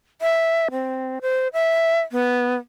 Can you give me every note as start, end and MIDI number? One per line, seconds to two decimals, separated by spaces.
0.22 0.68 76
0.72 1.19 60
1.22 1.48 72
1.53 2.00 76
2.12 2.54 59